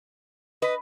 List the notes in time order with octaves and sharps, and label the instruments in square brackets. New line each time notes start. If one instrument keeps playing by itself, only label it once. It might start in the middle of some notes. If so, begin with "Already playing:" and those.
[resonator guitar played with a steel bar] B4 [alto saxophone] D#5